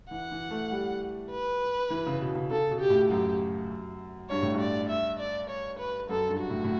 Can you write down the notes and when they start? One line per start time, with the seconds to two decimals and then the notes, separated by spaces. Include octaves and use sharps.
0.11 E3 F#5
0.31 E3
0.51 A3
0.71 G3
1.31 B4
1.90 E3
2.06 C#3
2.21 B2
2.35 C#3
2.50 C#3 A4
2.70 B2
2.80 G4
2.90 A2
3.11 F#2 G4
4.30 G2 C#5
4.42 A2
4.54 G2
4.60 D5
4.90 E5
5.19 D5
5.50 C#5
5.79 B4
6.09 F#2 A4
6.29 G2
6.40 F#4
6.50 A2
6.64 A2